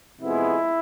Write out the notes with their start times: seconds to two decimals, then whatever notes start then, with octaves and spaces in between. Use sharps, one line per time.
0.20 F2 C3 G#3 B3 E4